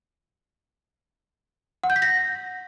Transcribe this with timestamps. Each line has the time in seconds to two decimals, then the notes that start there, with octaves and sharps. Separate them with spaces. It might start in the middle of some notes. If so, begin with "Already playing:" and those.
1.84 F#5
1.90 G6
1.96 B6
2.02 A#6